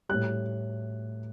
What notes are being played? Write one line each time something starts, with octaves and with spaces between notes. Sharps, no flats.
A2 G3 F#6